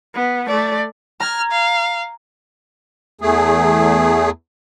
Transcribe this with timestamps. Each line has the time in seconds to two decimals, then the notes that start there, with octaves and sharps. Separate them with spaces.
0.15 B3
0.48 A3 D5
1.20 A#5 F6 G#6
1.51 F5
3.21 E2 A3 G#4